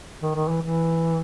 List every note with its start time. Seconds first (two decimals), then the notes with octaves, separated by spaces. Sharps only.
0.23 D#3
0.35 D#3
0.48 E3
0.62 E3